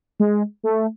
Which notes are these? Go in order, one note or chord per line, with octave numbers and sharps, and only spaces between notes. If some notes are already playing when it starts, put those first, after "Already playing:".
G#3
A3